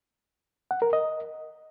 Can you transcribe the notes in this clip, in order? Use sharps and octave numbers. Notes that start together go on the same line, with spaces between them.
F#5
A#4
D#5